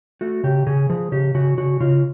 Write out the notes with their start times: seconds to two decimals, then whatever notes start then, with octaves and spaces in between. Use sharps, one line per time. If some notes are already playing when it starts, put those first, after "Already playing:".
0.21 A3 F#4
0.44 C#3 G4
0.67 C#3 G#4
0.90 F3 G#4
1.12 C#3 G4
1.35 C#3 F#4
1.57 C#3 F#4
1.80 C#3 F4